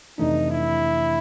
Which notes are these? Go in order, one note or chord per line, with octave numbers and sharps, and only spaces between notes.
F2 C3 E3 A3 D4 D#4
E4